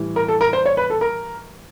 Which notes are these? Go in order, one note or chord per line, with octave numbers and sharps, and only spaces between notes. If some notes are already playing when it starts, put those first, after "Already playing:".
Already playing: A2 E3 G3
A#4
A4
A#4
C5
C#5
B4
A4
A#4